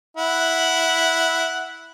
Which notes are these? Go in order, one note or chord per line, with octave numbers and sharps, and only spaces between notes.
E4 F#5